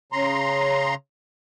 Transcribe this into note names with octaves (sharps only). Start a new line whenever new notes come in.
C#3 A#5 C6